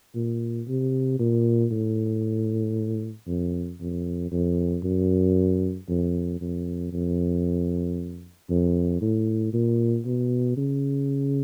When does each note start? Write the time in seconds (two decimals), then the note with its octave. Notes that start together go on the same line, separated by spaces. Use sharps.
0.15 A#2
0.68 C3
1.19 A#2
1.71 A2
3.27 F2
3.81 F2
4.32 F2
4.84 F#2
5.89 F2
6.41 F2
6.92 F2
8.50 F2
9.01 A2
9.53 A#2
10.06 B2
10.57 C#3